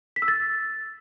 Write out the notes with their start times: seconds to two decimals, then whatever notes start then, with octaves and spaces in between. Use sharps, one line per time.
0.16 B6
0.22 E6
0.28 A6